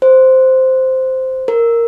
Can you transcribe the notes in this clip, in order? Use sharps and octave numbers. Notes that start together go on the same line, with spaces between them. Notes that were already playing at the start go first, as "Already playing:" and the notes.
C5
A#4